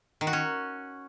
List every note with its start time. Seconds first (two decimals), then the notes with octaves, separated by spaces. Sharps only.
0.21 D#3
0.27 F#4
0.33 C#4